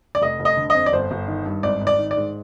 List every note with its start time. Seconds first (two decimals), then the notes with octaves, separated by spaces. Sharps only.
0.15 D5
0.22 F1 D#5
0.40 F1
0.45 D#5
0.57 D3
0.70 F2 D#5
0.86 D5
0.93 G1 C5
1.11 G1
1.28 D#3
1.45 G2
1.63 G#1 D5
1.81 G#1
1.87 D5
1.99 D#3
2.11 D5
2.17 G#2